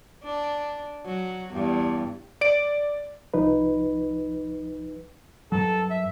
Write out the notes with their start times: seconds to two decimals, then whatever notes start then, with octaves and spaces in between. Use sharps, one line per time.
0.23 D4
1.06 F#3
1.51 E2 G2
2.41 D5 D7
3.34 C2 F3 D#4 B4
5.52 G2 F#3 A4
5.90 E5